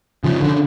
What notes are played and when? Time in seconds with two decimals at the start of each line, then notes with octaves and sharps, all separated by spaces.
0.24 C#3 F3
0.42 D3